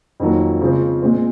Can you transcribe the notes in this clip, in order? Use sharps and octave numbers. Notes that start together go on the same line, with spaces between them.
F2 D#3 F#3 A#3
C#3 F3 G#3 C4
A#2 G#3 C4